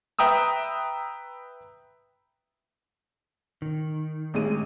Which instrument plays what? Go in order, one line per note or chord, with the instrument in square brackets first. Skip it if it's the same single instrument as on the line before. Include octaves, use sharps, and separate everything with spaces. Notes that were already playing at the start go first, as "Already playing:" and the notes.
[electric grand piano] B4 E5 G5 A#5 D#6 E6
[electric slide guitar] D#3
[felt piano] A1 G#3 D#7